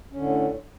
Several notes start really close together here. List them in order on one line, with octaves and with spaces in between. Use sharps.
C#4 D3 A2